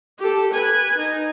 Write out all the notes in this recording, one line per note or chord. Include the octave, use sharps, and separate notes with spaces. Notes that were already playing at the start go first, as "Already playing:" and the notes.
G4 A4
B4 G#5
D#4